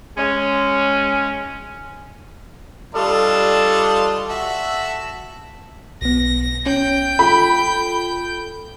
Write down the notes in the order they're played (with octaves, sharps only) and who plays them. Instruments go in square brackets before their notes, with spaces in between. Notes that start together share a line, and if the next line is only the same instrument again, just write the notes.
[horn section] G#3 C#4
[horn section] G3 A4 [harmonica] D4 F4 D#5
[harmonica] F#4 A4 E5
[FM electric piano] B1 B3 [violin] A#6
[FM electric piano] C#4 [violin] G5 G6
[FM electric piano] F4 A4 [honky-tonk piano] B5